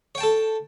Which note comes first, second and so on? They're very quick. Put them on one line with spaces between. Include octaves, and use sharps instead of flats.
C#5 G5 A5 A4